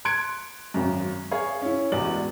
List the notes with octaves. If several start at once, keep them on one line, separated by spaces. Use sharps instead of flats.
C6 F#6 G#6 C#7 D7
G#1 F#2
G#4 C#5 F5
C#4 E4
A1 E2 G#3 F#4 D5 F#7